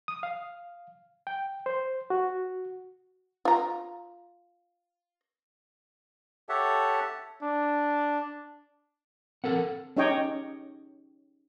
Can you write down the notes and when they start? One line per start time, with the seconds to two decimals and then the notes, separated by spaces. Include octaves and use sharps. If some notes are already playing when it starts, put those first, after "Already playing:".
0.08 D#6
0.23 F5
1.27 G5
1.66 C5
2.10 F#4
3.45 F4 A#5
6.49 G4 A4 C#5 E5 F#5 A5
7.43 D4
9.44 C4 A4 A#4 F#5
9.97 C#4 D#4 G4 C#5 D#5 G5